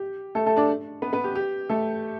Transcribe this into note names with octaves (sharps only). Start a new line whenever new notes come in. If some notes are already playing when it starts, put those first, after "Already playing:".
Already playing: G4
A3 A4
A3 A4
D4 D5
B3 B4
B3 B4
G4
G4
A3 A4